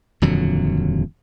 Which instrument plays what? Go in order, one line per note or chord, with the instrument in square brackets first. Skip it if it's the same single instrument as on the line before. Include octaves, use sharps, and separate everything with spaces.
[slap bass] D#1 F2 D3 F#3